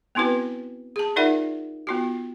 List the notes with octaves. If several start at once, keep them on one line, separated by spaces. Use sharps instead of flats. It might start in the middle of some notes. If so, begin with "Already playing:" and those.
B3 C4 E4 F#4 B4
G#4 A5
D#4 F4 A#4 D5 E5 F#5
B3 F4 F#4